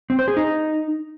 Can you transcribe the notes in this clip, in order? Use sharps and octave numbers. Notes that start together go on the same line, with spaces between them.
C4
C5
G#4
D#4